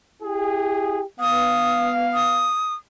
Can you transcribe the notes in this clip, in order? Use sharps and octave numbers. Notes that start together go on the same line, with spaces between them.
E4 G4 G#4
B3 F5 D#6
D#6